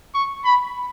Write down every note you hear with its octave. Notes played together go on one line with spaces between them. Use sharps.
C#6
B5